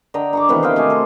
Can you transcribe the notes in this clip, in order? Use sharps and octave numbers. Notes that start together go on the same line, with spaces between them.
D3 D#5 G5 A#5
A#5 C#6 D6
C3 D#3 E3 B3
C5 D#5 F5 G5
C3 A3 F#4 G#5
A4 C5